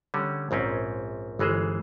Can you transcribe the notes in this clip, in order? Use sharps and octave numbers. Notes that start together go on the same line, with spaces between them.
D3 G3 C#4
A#1 G#2 C4 C#4
G1 E3 G#3 G#4 C5